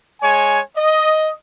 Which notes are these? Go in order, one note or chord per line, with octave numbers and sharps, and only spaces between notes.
G#3 C#5 G#5
D#5